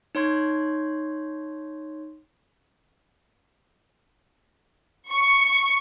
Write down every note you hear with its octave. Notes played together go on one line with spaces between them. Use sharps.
D#4 C#5 C6 G#6
C#6